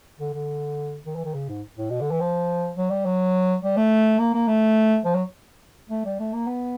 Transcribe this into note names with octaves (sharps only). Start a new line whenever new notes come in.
D3
D3
D#3
E3
D#3
C#3
G#2
A2
B2
D3
E3
F3
F#3
G3
F#3
G3
A3
A#3
A#3
A3
F3
F#3
A3
G3
A3
A#3
B3